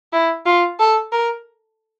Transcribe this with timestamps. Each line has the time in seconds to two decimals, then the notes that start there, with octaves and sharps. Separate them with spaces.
0.13 E4
0.46 F4
0.80 A4
1.12 A#4